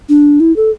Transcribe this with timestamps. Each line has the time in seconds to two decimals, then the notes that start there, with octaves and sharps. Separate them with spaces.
0.09 D4
0.40 E4
0.56 A4